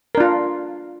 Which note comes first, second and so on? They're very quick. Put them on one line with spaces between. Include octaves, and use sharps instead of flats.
A#4 D4 F4